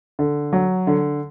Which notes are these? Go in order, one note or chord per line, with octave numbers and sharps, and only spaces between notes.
D3
F#3
D3